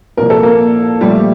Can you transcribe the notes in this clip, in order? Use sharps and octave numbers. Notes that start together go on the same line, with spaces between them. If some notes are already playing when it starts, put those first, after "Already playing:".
C2 A#2 F3 A#3 A#4
A4
A#3 A#4
A#2 F3 G3 A3 G4